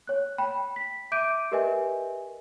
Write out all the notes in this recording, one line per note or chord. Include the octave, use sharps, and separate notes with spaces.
C#5 F#6
G5 B5
B6
E5 D6 G6 D7 D#7
G4 A#4 B4 D#5 E5 G#5